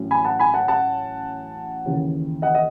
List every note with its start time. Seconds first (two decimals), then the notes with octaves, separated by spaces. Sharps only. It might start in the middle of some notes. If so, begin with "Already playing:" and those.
Already playing: A1 A2 F#3 C#4
0.11 G#5 B5
0.25 F#5 A5
0.39 G#5 B5
0.54 F#5 A5
0.68 F#5 A5
1.85 D#2 C#3 E3
2.42 D#5 F#5
2.55 D#5